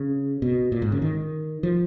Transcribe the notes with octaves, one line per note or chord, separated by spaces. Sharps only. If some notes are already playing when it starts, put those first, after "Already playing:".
Already playing: C#3
B2
A#2
G#2
C#3
D#3
F3